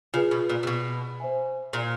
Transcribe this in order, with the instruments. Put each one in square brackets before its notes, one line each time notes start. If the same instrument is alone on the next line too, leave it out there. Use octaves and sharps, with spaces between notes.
[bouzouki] C#3 [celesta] F4 G#4 B4
[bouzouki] B2
A#2
C3
B2
[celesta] C5 E5 G#5
[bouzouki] A#2